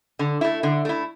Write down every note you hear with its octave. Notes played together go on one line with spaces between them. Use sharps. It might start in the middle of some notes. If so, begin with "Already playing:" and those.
D3
A3 E4
D3
A3 E4